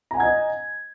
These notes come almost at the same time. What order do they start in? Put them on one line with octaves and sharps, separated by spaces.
A#5 G#5 F#5 G#6 D#5